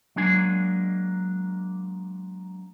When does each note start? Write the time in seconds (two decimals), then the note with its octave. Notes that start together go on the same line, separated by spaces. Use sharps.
0.16 F#3 G#3 A#3 D4 G#5